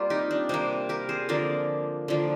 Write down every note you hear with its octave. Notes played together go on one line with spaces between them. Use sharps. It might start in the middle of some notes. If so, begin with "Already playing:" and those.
Already playing: G3 A#3 C4 F4
D#4 G4
D4
C3 G3 A#3 C4
G4 A#4
G#4 C5
D3 F3 A#3 A#4 D5
D3 F3 A#3